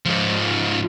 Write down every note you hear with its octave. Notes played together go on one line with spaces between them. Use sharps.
G#2 F3